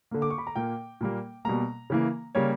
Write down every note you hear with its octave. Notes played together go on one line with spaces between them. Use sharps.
D3 A#3
D6
C#6
B5
A#5
A#2 A#3 G5
A#2 G3 A#3
B2 G3 A#3 A#5
C#3 E3 A#3
C#3 G3 A#3 C#5